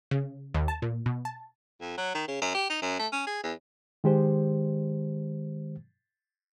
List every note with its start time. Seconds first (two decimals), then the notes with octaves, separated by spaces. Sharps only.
0.11 C#3
0.54 D#2
0.68 A5
0.82 A#2
1.06 B2
1.25 A5
1.81 F2
1.98 F#3
2.15 D#3
2.28 C#3
2.42 F#2
2.55 G4
2.70 D#4
2.82 F#2
2.99 A3
3.12 C#4
3.27 G#4
3.43 E2
4.04 D#3 G#3 G4 C5